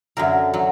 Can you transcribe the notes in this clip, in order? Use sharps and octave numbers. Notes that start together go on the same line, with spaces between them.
F#2 D3 F#3 A#4
F#3